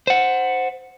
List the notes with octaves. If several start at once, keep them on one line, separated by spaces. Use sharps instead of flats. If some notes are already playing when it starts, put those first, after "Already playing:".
C5 F#5